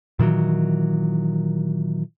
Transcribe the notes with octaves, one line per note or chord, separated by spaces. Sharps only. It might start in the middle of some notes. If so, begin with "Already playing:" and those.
A#2 D#3 E3 F#3